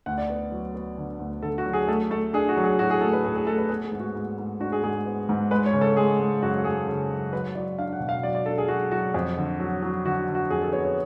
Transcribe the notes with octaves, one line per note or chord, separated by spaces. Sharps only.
D2 F#5
D5
B3
F#3
B3
D3
D2
D3 A4
F#4
F#3
G#4
A3 A4
A3 A4
D4 G#4
F#4
F#3
G#4
A2 F#4
G#4
A3 A4
B4
A2 G#4
G#4
A3 A4
B4
B3 G#4
G#4
G#2
F#4
G#2
G#2
D4 F#4
G#4
G#2 G#4
B3
G#2
G#3 B4
C#5
C#3
A4
G#3 G#4
G#3
F#2 F#4
G#3 G#4
C#3
F#2
F#3 B4
F#3 D5
D4 F5
F#5
B2
F5
F#3 D5
D5
D4 A4
G#4
F#3 F#4
F#3 F#4
F2
D3
F#3
F#3
D3 F#4
D3
F#4
F2 G#4
A4
B3 C#5
C#5